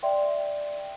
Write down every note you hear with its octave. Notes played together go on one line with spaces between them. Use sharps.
D5 E5 G5 C6